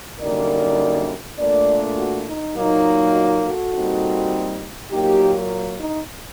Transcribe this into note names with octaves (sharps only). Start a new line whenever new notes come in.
F#2 D3 G3 A#3 D#4 A#4 D5
A#2 A3 D4 A#4 D5
F#4
D#4
A#2 F#3 A#3 D#4
F#4
F#4 A4
A#2 G3 C4 D#4
A#2 F#3 A#3 D#4 G4
D#4